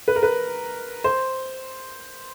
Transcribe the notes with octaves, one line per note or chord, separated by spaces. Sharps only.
B4
A#4
B4
C5